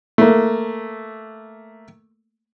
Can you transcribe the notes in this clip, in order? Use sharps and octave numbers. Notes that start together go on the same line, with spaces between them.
A3 A#3